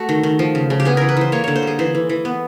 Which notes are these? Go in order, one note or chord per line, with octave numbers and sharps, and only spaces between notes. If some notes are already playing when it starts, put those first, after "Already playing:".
Already playing: A3 F#4
D#3
D#3
F3
C#3
C#3
G4
B3 G#4
E3 A#4
B4
E3 C5
A#3 C#5
D3 C#5
C5
G3 G#4
E3 C5
E3
E3
B3